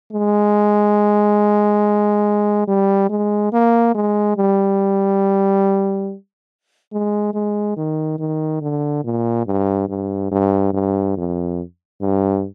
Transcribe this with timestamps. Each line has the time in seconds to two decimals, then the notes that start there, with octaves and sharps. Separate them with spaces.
0.12 G#3
2.67 G3
3.10 G#3
3.53 A#3
3.95 G#3
4.37 G3
6.93 G#3
7.34 G#3
7.76 D#3
8.19 D#3
8.62 D3
9.05 A#2
9.46 G2
9.89 G2
10.31 G2
10.74 G2
11.17 F2
12.01 G2